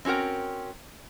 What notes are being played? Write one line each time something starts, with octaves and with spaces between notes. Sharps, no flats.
C4 C#4 F#4 A#4 G5